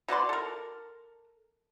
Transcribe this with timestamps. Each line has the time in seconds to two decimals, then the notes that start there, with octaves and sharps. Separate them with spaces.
0.08 B2 F#4 D5 C6
0.29 A4 A#4